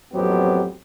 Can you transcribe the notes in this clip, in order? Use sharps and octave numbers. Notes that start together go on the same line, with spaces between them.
A1 F2 F#3 B3 C4 G4